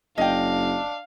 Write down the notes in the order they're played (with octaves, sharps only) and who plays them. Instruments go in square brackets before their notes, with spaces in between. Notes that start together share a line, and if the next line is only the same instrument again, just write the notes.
[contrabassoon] F#1 [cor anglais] D4 [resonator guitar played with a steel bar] D#5 G5 [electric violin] F5